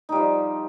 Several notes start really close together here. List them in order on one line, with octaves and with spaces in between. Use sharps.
D#4 G3 F3